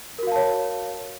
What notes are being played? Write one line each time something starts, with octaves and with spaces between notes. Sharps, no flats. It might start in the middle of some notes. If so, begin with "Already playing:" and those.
F#4 A#4 C#5 F5 A5